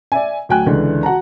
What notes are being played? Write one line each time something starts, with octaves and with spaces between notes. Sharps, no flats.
D5 E5 G#5
D2 F#3 G5 G#5 F#6
C#2 D3 E3
F#4 F#5 A5 A#5